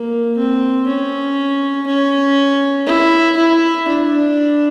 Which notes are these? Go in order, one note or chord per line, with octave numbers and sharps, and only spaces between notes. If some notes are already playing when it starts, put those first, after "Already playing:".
Already playing: A#3
C4
C#4
C#4
E4
E4
D4